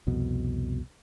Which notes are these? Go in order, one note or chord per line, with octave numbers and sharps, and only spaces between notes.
C2 F2 B2